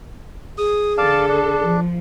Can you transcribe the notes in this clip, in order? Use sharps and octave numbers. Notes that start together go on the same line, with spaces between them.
G#4 D#6
D3 A4 D5 F5 A5
D4
F3